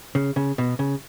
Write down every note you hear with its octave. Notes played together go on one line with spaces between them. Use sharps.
C#3
C#3
B2
C#3